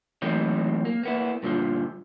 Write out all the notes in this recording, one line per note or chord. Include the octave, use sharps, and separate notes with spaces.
E3 F#3 A3 A#3 C4 D#4
A#3
A#3 B3 E4
G2 A#2 D3 E3 F3